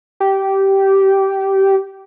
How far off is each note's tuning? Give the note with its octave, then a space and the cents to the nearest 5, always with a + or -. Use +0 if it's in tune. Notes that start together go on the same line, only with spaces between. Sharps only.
G4 -15